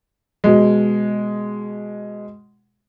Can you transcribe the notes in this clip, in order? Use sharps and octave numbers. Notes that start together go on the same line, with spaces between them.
B2 G#3